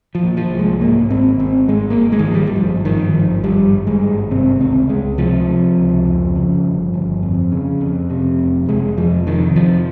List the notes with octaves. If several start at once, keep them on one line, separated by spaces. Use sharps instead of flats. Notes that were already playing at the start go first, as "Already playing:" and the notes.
F3
A#2
F3
C2
G#3
G#2 A#3
G#1 C4
G#1 C4
G#2 G#3
A#3
G#2
G#3
D#3
G#1 F3
G3
G3
G2 F3
G#1 D#3
G#1 F3
G2 G3
G2
G#3
G#1
C3 C4
C#2 C4
C#2 G#3
C3 F3
C3
C#2
F2
C#3
G1
G1
F2
C#3
F2
C3
F1
F1 G#3
F2 F3
C3 D#3
F2 F3